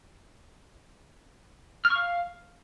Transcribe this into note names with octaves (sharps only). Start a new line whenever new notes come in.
F6
C#6
F5